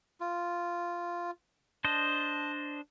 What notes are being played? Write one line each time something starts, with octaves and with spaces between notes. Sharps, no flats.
F4
D4 C5 D#5 A5